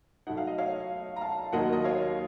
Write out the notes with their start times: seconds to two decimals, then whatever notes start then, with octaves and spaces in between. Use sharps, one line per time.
0.27 A2 F#3 A3 D#4 F#5
0.37 F5
0.47 D#5
0.58 C#5 F5
1.16 A#5
1.21 F5 A5
1.52 D#2 D#3 F#3 D#5 F#5
1.73 D#5
1.84 C#5 F5